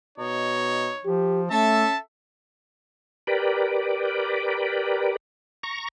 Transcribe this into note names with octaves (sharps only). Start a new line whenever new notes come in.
B2 D#4 C#5
F3 G4
A3 C#4 A4 E5 A5
G4 A#4 B4 D5
A#5 C#6